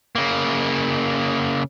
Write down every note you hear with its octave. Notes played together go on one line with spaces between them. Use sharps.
C#3 A#3